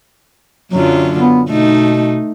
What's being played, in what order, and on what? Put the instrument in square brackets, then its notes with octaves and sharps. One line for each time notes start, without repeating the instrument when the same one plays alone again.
[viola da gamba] F#2 D3 F4 [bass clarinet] F#3
[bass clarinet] B3
[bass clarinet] B2 [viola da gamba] A3 D#4